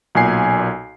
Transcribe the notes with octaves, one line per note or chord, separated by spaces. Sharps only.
B1 A#2 G#5 C7